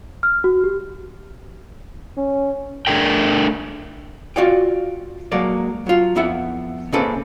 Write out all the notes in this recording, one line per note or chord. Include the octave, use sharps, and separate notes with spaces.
F6
F#4
G4
C#4
A3 D4 G#4 A#4 G5
F4 F#4 D5 F5 G5
F#3 G#3 A#3 A4 D5
F#3 F4
F2 B3 E4 E5 F#5
C#3 A#3 C4 C#4 A4 B4